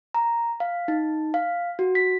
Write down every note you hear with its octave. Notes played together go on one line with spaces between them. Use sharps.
A#5
F5
D#4
F5
F#4
B6